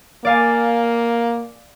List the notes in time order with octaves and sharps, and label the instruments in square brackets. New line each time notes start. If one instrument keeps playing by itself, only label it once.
[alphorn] A#3 [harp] D5 F5 G#5